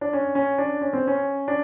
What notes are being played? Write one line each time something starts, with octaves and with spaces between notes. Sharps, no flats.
D4
C#4
C#4
D4
C#4
C4
C#4
D4